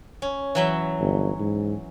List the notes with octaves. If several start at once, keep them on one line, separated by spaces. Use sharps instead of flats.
C#4
E3 F#3 E5
G1
G#2